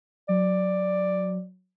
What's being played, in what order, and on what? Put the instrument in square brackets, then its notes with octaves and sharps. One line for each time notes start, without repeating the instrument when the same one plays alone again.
[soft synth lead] F#3 [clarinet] D5